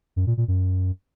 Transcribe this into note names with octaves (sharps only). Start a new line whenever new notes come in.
F#2
A#2
A#2
F#2